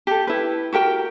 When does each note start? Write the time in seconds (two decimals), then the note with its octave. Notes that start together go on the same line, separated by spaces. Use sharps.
0.07 G4 A4
0.27 E4 B4
0.73 F#4 G4 A#4 G5